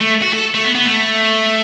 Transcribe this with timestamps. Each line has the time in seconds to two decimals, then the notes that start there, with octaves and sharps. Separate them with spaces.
0.01 A3
0.22 F#4
0.33 A4
0.54 A3
0.65 B3
0.75 B3
0.86 A3